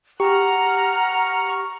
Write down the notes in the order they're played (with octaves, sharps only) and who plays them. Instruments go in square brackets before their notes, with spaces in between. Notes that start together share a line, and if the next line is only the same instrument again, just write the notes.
[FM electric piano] G4 [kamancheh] F#5 F6 [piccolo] A#5 [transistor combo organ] C#6